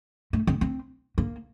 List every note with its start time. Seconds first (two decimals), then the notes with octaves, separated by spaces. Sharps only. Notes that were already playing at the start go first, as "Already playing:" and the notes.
0.33 A3
0.47 C4
0.61 C4
1.18 A#3